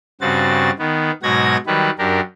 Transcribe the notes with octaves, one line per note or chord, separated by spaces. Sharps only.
G2 C#3 C4 F#4 A6
D#3 B3
G#2 B2 F#3 F#4 G#6 A#6
D#3 F#3 G3 B4
F#2 D4 G4 A#4